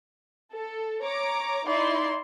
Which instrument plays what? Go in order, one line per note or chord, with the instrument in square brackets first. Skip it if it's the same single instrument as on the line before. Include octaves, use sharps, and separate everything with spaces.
[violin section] A4
C#5 A#5 D6
[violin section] D#4 E4 C6 [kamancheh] D5